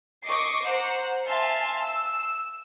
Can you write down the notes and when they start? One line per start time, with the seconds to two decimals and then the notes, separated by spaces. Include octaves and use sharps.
0.24 D#5 C#6 D6 C7
0.63 C5 F#5 A#5
1.27 E5 F5 G#5 A5 C6
1.82 E6